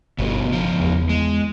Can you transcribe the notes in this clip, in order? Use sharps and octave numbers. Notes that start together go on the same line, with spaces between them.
G1 G2 B2
C#2 F3
E2
G#3